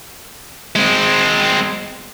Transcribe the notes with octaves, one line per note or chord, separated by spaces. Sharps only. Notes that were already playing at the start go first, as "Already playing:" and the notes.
G#3 C4